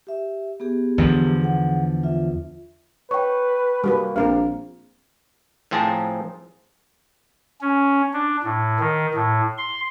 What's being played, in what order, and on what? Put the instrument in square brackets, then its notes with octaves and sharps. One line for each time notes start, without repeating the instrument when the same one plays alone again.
[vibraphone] G4 E5
B3 G4 G#4
[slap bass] E2 D3 F3
[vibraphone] G#4 F#5
F4 E5
[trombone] B4 [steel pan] C#5 [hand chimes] G5 C#6
[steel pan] G3 F#4 B4 [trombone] A#3
[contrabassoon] A#1 [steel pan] C4 A#4 F5
[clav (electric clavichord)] A2 F3 C4 G#4 A5 A#5
[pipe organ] C#4
D4
A2
D#3
A2
C6